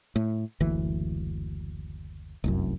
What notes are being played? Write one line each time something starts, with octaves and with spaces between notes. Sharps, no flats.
A2
F#1 D2 E3
F1 C2 F#2